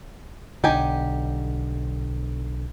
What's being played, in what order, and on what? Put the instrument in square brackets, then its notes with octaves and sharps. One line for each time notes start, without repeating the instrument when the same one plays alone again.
[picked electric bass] B1 D3 [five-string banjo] D#4 G4 G#5